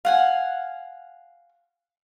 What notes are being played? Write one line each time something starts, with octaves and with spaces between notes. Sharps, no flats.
F5 F#5 G#5